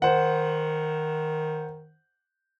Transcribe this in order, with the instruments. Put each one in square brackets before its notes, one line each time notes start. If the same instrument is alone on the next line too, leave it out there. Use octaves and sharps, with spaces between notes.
[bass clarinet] D#3 [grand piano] C5 F#5